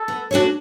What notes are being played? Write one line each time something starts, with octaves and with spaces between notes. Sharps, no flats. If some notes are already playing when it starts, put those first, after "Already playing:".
Already playing: A4
B3
D4 F#4 A4 C#5